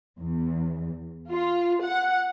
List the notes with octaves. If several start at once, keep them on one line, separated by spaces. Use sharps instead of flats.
E2
F4
F#5